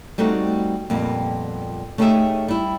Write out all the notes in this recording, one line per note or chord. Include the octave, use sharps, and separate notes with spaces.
G3 A3 C4 D#4 F#4
F2 A#2 G3 B3
A3 C#4 D#4 G4 G#4 E5
G3 E4